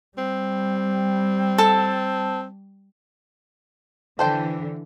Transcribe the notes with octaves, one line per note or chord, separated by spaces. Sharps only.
G3 C4
A4 A5
D3 E3 A4 C5 G5